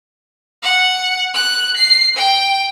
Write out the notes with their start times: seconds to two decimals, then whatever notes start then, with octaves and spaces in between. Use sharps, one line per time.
0.63 F#5
1.35 F#6
1.77 C7
2.17 G5